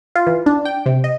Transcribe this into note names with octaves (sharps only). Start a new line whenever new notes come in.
F4
E3
D4
G5
C3
D#5